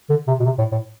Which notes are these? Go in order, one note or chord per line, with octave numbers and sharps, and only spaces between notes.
D3
C3
B2
C3
A2
A2